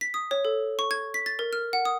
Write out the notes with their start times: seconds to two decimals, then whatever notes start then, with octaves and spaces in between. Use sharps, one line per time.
0.01 B6
0.14 D#6
0.31 C#5
0.45 A4
0.79 C#6
0.91 G#6
1.14 B6
1.26 A6
1.39 A#4
1.53 F6
1.73 F#5
1.85 D#6